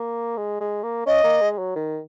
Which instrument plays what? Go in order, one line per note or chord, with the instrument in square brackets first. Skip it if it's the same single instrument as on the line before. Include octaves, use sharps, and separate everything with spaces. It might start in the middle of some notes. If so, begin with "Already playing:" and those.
Already playing: [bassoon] A#3
G#3
G#3
A#3
[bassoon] C#4 [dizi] D#5
[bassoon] A#3
G#3
F#3
D#3